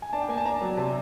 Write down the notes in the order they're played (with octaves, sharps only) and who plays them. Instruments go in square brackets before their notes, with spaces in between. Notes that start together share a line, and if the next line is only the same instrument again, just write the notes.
[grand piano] G#5
[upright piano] D4 [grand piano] A5
[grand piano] G5
[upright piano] A#3 [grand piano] G#5
[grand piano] A5
[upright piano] D4 [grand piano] A#5
[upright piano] F#3
[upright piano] C3 [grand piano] A5